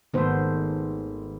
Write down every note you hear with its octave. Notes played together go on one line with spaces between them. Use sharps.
G#1 D#3 A3 B3 C5